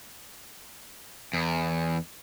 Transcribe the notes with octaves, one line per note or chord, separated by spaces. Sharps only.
E2